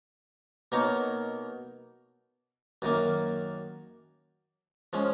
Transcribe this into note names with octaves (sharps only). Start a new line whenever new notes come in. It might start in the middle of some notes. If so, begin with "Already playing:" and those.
B2 A#3 D#4 A#4 C#5
F#2 D#3 A#3
F3 G#3 C#4